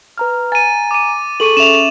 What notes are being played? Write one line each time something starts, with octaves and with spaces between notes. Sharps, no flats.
B4 A#5 F6
G#5 A#5 A6 D#7
D6 D#7
G#4 A4 C#6 D#7 F#7
C#4 E5 E7 F7